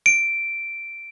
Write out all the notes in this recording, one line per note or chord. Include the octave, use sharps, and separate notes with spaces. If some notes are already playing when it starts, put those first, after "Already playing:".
D7